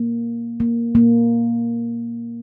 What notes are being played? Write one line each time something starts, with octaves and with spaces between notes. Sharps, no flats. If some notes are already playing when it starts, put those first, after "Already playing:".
Already playing: A#3
A#3
A#3